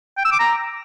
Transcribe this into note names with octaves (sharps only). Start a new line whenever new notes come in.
G5
E6
D6
A#5